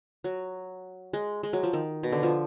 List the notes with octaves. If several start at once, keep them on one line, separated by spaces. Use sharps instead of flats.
F#3
G#3
G#3
F#3
F3
D#3
B2
D3
F3